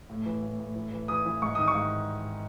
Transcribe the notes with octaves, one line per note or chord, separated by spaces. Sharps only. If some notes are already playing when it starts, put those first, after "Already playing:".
A2
E3
A2
A2
E3
E3
E3 D#6
E3
G#2 C#6
D#3 D#6
C#6
G#2